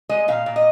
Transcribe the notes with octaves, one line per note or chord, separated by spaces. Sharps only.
G#3 D#5
A#2 F5
A#2
D#5